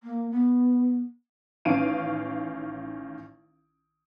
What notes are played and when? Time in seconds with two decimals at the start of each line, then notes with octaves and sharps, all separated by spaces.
0.03 A#3
0.31 B3
1.65 A1 D#3 C#4 F5 D7 D#7